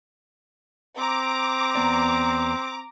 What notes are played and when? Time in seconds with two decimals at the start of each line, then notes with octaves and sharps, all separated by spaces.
0.98 C4 A#5 D6
1.75 E2 B3 D5